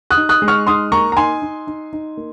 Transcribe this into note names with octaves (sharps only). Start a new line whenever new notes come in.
D#6 F#6
D#4
D#6 F#6
G#3
C#6 F6
D#4 C6 D#6
A#3 A#5 C#6
A#5
D#4 G#5 C6
D#4
D#4
D#4
A#3